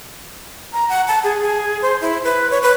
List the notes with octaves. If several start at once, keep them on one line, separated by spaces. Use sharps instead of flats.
A#5
F#5
A5
G#4
G#4
C5
E4
B4
C#5
B4